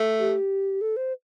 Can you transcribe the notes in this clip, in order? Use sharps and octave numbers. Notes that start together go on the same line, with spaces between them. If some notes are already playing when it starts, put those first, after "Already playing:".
Already playing: A3
G4
A4
C5